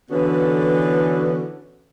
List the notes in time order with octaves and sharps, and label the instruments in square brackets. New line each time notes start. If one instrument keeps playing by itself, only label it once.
[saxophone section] D3 E3 B3 C#4 F#4 A4